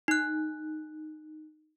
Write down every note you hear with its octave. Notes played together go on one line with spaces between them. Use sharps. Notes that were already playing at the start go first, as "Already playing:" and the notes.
D#4 F#6